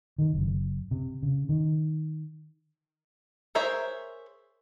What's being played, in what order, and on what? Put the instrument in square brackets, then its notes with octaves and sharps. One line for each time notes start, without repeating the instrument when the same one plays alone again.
[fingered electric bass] D#3
F#1
C3
C#3
D#3
[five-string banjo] G#4 A#4 C5 C#5 E5